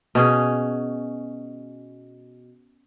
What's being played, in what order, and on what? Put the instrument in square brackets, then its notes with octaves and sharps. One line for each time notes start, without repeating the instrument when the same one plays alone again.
[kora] B2 C#4 G#4